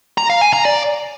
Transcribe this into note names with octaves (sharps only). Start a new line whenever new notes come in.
A#5
F5
G#5
A#5
D5